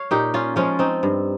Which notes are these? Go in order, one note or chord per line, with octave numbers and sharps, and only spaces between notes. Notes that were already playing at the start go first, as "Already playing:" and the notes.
Already playing: C#5 F5
A#2 D#4 G4
C#4 F4
F3 G#3 C#4 F4
C4 D#4
G2